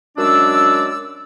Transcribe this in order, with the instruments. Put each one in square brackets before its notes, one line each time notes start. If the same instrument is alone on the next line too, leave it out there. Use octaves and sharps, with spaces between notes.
[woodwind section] F#2 G#3 D4 D5 E6